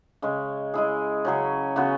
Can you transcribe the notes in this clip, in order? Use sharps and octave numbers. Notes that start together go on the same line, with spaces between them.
C#3 G#3 C#4
G#3 E4 G#4
C#3 F#3 C#4 G#4
C#3 E3 B3 F#4